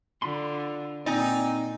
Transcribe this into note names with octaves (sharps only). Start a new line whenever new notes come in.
D3 F4 B5 C6
A#2 C4 D#4 D5 G#5